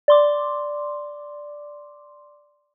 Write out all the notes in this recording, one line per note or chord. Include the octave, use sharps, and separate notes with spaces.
D5 C6 D6